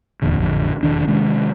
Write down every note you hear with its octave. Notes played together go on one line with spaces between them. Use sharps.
D#1 E2 A#2 D3
A1 F2 D3
E1 E2 D#3 D4
C3 D#3 G#3 C#4